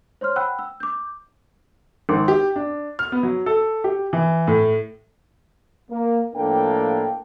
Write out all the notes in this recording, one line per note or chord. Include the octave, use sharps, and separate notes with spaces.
C5 C#5 C6 F6
F#5 G5 B5 E6 F#6
E6
D6 G6
G#1
G4
D4
F6
B3
F#3
A4
G4
E3
A2
A#3
A2 F3 A#3 D4 A4 G5